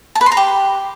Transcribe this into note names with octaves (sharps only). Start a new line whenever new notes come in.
A5
B4
C6
A#5
G4